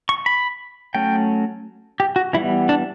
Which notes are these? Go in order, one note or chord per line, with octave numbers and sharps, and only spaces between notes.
C#6
B5
F#3 A3 C#4 G5
G4
F#4
E3 G3 B3 E4
D4